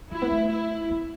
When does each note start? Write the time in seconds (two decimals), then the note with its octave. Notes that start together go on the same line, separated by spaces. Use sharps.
0.11 F#3 E4
0.22 B3
0.31 A3
0.50 E4
0.90 B3